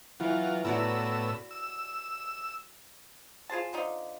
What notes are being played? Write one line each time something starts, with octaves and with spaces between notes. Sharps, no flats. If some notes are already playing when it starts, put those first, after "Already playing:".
E3 F#3 F4
A2 B3 F#4 D5 A#5 E6
E6
F4 G#4 C5 A5
D3 F3 D#4